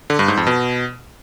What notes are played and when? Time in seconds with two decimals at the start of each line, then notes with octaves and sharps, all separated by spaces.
0.10 D3
0.19 G2
0.28 G#2
0.37 F2
0.47 B2